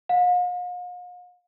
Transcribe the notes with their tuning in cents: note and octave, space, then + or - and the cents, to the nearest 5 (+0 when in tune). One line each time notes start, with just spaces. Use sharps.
F5 +45